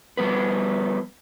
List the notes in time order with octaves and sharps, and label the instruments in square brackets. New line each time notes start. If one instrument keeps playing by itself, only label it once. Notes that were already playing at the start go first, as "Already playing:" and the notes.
[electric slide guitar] F3 G3 B3 B4